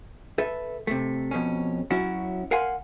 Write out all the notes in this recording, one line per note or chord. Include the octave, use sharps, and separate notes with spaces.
A4 B4 E5
C3 A3
F2 B2 C#4
F#3 C#4 E4 F#4
A#4 F5 F#5 G#5 C6